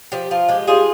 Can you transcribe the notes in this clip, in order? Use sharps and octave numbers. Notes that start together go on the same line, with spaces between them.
F3 G4
F3 F4
G#3 G4
G3 F4 G#4